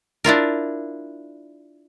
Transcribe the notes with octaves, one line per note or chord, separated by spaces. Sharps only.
D4 E4 F4 A#4